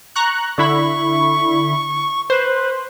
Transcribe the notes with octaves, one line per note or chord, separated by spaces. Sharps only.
A#5 C#6 F#6
D3 E4 B5 C#6
B4 C5